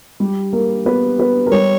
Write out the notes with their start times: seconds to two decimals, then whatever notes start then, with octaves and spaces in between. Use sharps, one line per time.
0.20 G3 G4
0.53 A#3 A#4
0.86 B3 B4
1.19 B3 B4
1.46 A#4
1.51 G3 G4 C#5